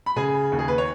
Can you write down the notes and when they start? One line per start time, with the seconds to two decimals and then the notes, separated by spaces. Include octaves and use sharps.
0.06 B5
0.16 C#3 G#4 G#5
0.52 D#2
0.59 G#4
0.68 B4
0.78 C#5